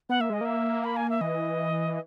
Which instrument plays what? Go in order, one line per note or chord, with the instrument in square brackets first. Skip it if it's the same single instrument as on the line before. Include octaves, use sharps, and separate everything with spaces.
[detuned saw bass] B3 [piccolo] F#5
[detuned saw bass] A#3 [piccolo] E5
[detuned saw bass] G#3 [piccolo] D#5
[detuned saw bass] A#3 [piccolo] E5
[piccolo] B5
G#5
E5
[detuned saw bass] E3 [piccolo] D#5